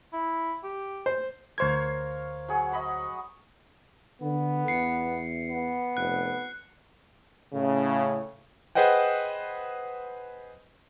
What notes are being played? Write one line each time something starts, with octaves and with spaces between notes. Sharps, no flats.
E4
G4
C5
D2 A#4 C5 C#5 F5 G#6
F#3 G#4 F#5
D#5 B5 C#6
D3 B3
E2 C7 C#7
B3
F1 F#6
A2 C#3
G#4 B4 C5 D#5 F#5 G5